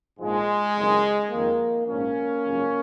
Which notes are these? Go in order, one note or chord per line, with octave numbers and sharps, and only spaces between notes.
A#1 G#2 F3 G#3
F#1 F2 D#3
F2 D#3 A#3
A#1 G#2 F3 A#3 C#4
G#1 F#2 C#3 F3